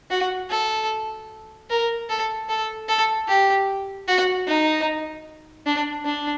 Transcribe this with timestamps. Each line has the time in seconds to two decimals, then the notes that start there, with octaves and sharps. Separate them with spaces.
0.11 F#4
0.50 A4
1.70 A#4
2.09 A4
2.49 A4
2.88 A4
3.28 G4
4.08 F#4
4.47 D#4
5.66 D4
6.05 D4